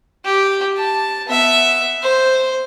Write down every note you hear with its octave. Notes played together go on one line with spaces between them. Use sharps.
G4
A5
B3 E5
C5